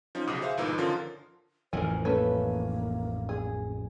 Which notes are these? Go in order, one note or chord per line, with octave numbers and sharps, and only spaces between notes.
F3 C#4 D#4
B1 C#3 F#4 D6 D#6
G#4 C5 E5 F5
G1 A#2 E3 D#4 A#4 E6
D3 F3 C#4 F4 A#4
A1 F2 E3 A#4 C5 G#5
A3 A#3 C#4 B4
G#4